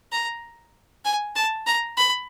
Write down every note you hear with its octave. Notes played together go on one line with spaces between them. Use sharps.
A#5
G#5
A5
A#5
B5